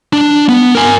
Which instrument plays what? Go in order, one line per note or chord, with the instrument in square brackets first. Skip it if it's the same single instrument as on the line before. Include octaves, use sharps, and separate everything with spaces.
[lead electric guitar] D4
B3
A#4 G#5